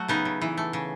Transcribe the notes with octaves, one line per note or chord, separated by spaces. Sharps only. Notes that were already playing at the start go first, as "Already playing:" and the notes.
Already playing: F#3 A3 F#4
C#3 B3 D#4
C#3
E3
A3
C#3